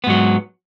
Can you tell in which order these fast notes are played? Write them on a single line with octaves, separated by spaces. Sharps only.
B3 G#2 F#3